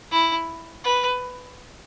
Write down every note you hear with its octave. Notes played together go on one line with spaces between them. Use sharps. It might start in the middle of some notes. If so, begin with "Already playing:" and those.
E4
B4